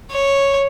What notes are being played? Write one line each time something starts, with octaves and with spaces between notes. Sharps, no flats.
C#5